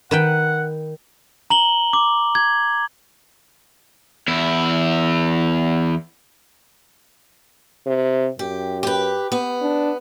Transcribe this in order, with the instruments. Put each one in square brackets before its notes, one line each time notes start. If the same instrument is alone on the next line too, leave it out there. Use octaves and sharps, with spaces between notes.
[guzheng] D#3 B4 G5 [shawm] F#5
[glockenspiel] A#5 F#7 G7
D6
G#6
[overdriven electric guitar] E2 E4
[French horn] C3
[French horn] F#2 [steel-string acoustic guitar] G4
[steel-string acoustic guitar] G4 B4
B3
[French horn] D4